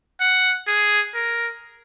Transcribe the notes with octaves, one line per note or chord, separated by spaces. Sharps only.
F#5
G#4
A#4